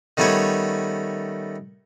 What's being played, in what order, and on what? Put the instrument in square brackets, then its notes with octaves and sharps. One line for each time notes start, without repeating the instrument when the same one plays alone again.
[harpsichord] D#3 G3 A3 B3 C#4 C#5